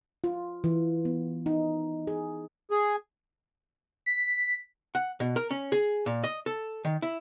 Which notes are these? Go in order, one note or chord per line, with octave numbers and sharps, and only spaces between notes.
F4
E3
B3
D#4
G#4
G#4
B6
F#5
B2
A#4
C#4
G#4
A#2
D#5
A4
D#3
E4